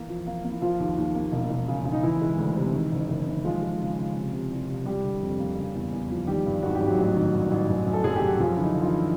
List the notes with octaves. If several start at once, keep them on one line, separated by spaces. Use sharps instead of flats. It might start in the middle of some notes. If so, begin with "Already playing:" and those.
Already playing: E3 A#3 E4
F3
A#3
A#3
E4
F3 A#3 F4
D#2
D#2
A#3
E1
E1
C#3
C#3
D#4
E3 E4
G#3
D2
C3
D#3
F#1
F#1
D#3
F3 G#3 F4
G#3
C#3
C#3
C3
C3
C2
C2
G3 G4
D3
F2
A#3
C#3
E2
E2
F3
D#3 G3 G4
G2
G#1 F#4
G4
G#1
F#3 F#4
A1
D#3
G2
A1
F#2
F#2
A4
F#2 G#4
G4
F#2
F#4
F#2 F3 F4
D3 E4
D#4
D3
F4
E3 E4